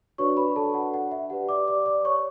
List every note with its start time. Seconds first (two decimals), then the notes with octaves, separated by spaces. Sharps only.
0.18 D4 F#4 B4 C#5 D5 C#6
0.37 B4 B5
0.56 A4 A5
0.74 F#5
0.94 F#5
1.11 E5
1.30 G4 B4 D5 F#5
1.49 D5 D6
1.68 D5 D6
1.86 D5 D6
2.05 C#5 C#6